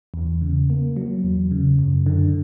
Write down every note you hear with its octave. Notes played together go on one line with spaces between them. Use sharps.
E2
C#3
A#3
F#3
E2
C#3
F#2
D3